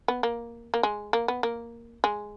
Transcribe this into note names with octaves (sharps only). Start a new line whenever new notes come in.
B3
A#3
A#3
G#3
A#3
B3
A#3
G#3